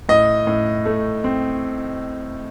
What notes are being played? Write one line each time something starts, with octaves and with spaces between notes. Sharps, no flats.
A2 D#5
A2
A3
C4